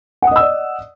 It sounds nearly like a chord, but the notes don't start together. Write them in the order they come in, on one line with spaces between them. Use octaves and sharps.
F#5 D#6 D#5 E6 D5